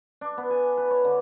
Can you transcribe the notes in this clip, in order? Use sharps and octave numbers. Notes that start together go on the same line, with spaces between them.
D4
B3
G#5
B4
C#5
D3